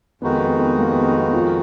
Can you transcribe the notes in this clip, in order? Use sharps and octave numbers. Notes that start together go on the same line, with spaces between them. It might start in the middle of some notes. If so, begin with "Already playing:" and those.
F2 D#3 G#3 B3 D#4 F#4
B3
B3
A#3
B3
B3
B3
F3